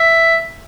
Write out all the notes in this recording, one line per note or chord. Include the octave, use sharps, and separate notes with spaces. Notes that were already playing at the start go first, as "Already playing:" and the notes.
Already playing: E5